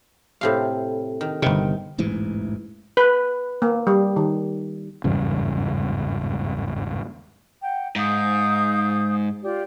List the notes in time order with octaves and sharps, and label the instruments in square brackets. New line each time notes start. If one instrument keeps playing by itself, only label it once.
[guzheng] A2 C3 F5
D#3
[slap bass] G1 C3 [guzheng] D#3
[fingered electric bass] E1 A1 G#2 E3
[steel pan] B4
A#3
G3
D#3
[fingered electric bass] G#1 E2 G2 C#3
[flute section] F#5 G5
[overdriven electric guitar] G#2 [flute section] F5 D#6 G6
[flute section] F4 G4 D5